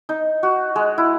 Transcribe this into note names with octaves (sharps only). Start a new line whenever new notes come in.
D#4
F#4
G#3
E4